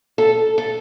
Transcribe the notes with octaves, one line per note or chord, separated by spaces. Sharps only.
A4
A4